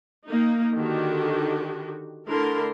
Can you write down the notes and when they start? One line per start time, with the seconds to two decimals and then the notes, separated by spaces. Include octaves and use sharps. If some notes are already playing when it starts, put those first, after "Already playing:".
0.26 A#3 D#4
0.74 D3 D#3 F#4 G4
2.26 D3 A3 E4 A#4 C6